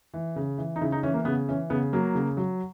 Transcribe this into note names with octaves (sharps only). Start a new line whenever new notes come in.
E3
C#3
E3
D#4
C#3 E4
D#4
E3 C#4
A#3
C#3 B3
E3 C#4
C#3 B3
F#3 A#3
C#3
F#3